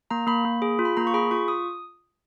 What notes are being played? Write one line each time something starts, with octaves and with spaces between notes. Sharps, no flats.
A#3 A#5
A#3 B5
A#3
G#4
F4
B5
A#3 A#5
C#6
G#4 B5
F4 C#6
D#6